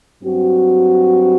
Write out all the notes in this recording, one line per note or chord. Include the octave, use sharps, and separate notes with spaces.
G2 F#3 C4 F#4